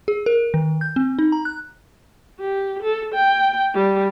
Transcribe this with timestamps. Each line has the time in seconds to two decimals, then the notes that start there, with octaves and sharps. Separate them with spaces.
0.08 G#4
0.26 A#4
0.54 D#3
0.81 G6
0.96 C4
1.19 D#4
1.32 A#5
1.45 F#6
2.40 G4
2.83 A4
3.14 G5
3.74 G3